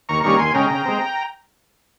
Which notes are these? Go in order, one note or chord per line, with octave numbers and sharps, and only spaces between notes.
D#2 A#5 C#6
D#3 G3 A#3 C#4 A#5 C#6
D#2 G#5 C6
C#3 G#3 C#4 G5 A#5
C#3
G#3 C4